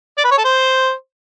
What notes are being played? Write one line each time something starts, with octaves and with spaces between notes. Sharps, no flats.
D5
B4
C#5
A4
C5